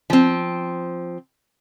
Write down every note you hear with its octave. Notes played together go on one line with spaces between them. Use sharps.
F3 C4